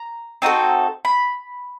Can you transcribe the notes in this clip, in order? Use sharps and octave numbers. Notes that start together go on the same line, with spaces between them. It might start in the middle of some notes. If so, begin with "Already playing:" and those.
Already playing: A#5
C4 D#4 F#4 A4
B5